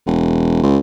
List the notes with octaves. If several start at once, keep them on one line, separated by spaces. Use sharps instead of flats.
E1
C#2